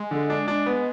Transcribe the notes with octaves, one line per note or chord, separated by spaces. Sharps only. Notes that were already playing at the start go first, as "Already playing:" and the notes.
Already playing: G#3
D3
D4
D4
B3